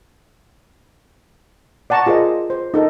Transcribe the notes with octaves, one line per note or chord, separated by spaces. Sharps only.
D5 F#5 A5 A#5 C#6
F4 G#4 A#4 C5 D#5
C5
D#4 A4 A#4 D#5